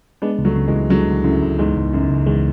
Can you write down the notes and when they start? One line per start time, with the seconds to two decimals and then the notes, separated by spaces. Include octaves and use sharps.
0.22 G#3 B3 D4
0.39 C#2
0.45 F#3 A3
0.56 C#3
0.67 E3 G#3
0.73 C#2
0.90 D3 F#3 G#3
1.08 C#2
1.24 F#2 A2 C#3
1.42 C#2
1.58 E2 G#2 G#3
1.76 C#2
1.93 F#2 C#3
2.10 C#2
2.26 E2 G#3